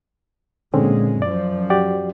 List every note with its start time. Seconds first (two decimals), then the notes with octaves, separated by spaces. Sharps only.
0.74 A#2 D3 G#3 C4 C#4
1.22 F#2 F3 D5
1.70 F#4 G4 D5